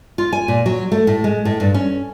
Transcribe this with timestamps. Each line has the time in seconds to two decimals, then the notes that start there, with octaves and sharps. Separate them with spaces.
0.18 F4
0.33 G#5
0.48 A#2
0.66 F#3
0.92 A3
1.07 A2
1.24 G#3
1.45 A2
1.60 G2
1.74 C#4